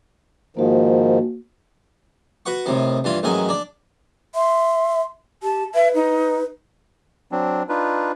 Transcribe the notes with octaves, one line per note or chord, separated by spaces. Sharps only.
G#2 D#3 F3 A#3 F#4
F#4 B4 F#5 C#6
A2 C3 D#3
G2 E3 F4
A1 G#2 D#3 F#3 G#5
D4 D5
E5 C6
G4 A5
B4 E5
D#4
F#3 C4 D4
D4 D#4 F4 B4